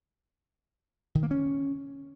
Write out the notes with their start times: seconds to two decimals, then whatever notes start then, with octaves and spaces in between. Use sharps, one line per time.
1.15 D#3
1.23 A#3
1.31 C#4